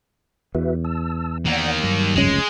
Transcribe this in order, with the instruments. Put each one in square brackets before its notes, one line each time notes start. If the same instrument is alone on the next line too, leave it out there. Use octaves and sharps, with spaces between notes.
[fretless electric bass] E2 [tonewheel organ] F#4 B4 E5
[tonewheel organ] A5 E6
[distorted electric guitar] D#3 A#3 [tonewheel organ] D5 F#5
[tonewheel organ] G2 F#3 G3
[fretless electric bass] F1 C#2 C#4 [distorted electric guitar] G#3